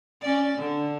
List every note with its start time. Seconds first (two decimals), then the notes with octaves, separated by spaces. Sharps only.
0.21 C#4 D5
0.58 D3